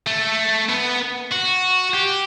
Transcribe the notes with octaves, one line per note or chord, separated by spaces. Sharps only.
A3
B3
F#4
G4